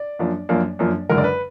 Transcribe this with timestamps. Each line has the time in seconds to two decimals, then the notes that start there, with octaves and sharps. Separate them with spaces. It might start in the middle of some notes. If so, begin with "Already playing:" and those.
Already playing: D5
0.19 F#2 F3 A#3 D4
0.49 F#2 F3 A#3 D4
0.79 F#2 F3 A#3 D4
1.09 F#1 F#2 D3 G#3 A#4
1.18 D5
1.24 B4